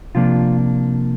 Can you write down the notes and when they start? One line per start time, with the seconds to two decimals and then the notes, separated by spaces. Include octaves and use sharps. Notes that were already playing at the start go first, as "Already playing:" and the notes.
0.15 C3 F3 A#3 D4 F4